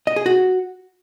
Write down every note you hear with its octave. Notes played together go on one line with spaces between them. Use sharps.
D#5
G#4
F#4